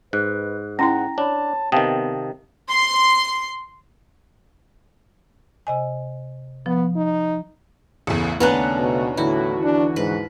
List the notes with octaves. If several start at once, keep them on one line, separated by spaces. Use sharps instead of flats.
G#2 B4 F#6
C#4 E4 F#5 G5 A#5 C6 A#6
D4 C#5 A5 B5
C3 D#3 B3 F5 G5 A5 D#6
C6 C7
C3 D#5 G#5
F3 B3
D#4
A1 E2 C#3 A3 F#5
D#2 B3 C#4 D4 A#5 F#6
B2
A2 D3 E3 E4 F#4
D4
G#2 B4